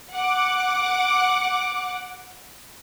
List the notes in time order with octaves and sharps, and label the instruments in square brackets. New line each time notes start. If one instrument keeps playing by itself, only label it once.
[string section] F#5 D6